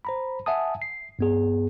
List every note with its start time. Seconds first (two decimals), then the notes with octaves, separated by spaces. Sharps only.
0.05 C5 A#5 B5
0.46 E5 F#5 G#5 A5 D#6
0.82 C7
1.19 G2 B3 G#4